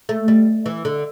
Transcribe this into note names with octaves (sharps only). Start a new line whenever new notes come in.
A3
G3
E3
D3